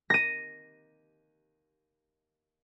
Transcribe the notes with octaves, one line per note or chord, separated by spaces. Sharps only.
A#6 D#7